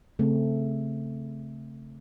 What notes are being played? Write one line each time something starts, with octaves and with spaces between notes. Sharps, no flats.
C#3 A3 C4